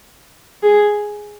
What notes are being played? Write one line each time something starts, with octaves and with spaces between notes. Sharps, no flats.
G#4